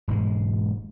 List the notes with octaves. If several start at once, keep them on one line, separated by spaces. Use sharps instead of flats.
E1 G#2 B2 G#3